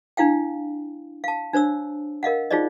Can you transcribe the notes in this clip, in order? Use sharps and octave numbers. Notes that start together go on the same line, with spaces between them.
D4 E4 F5 G5
F5 A5
D4 C5 C#5 E6
A#4 D#5 F5 F#5
D#4 F4 G#4 C5 D5 D#5